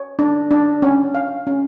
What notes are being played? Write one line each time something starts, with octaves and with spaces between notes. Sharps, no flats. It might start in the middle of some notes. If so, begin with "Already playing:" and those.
Already playing: C#5
D4
D4
C#4
F5
C#4